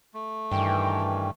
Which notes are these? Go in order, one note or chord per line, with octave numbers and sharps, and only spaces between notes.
A3
G2 D#3 E3 G5